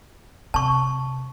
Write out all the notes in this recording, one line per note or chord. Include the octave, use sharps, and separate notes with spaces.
C3 A5 C#6